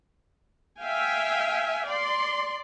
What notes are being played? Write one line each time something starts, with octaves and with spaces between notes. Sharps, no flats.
E5 F5 G5 G#5
D5 C6